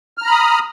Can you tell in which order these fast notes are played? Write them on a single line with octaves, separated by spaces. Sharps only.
F6 A#5 B5 D#6